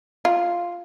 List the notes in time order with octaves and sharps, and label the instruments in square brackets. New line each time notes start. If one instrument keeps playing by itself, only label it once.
[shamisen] F4